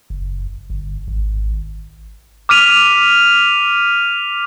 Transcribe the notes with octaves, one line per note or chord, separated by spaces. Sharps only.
F#1
G1
G#1
D6 F6 B6 D#7 F7